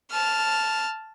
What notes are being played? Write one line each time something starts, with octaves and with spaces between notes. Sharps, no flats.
A5 F6